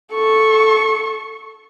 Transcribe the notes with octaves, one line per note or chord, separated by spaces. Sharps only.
A4 C#6